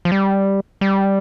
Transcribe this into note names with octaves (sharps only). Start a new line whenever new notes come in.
F3
G3
G3